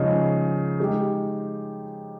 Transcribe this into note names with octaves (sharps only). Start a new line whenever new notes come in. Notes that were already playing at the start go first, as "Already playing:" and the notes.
Already playing: C#3 F3 G#3 D#4 G#4
G#3 D#4 G4